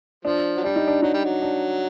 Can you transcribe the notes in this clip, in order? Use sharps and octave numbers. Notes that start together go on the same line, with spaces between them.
F3 D4
F#3
G3 D4
D#4
D4
F#3 D#4
G3
F#3
D4